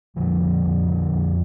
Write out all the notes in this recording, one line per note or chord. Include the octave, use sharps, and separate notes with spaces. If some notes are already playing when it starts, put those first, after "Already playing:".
F2 D3 F3
D3
F2
D3
F2